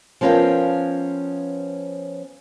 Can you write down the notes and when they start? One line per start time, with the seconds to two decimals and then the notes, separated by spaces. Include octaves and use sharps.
0.21 F3 B3 C#4 A#4 F5 G5